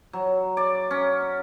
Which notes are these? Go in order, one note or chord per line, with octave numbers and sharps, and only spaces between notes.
F#3
D5
C#4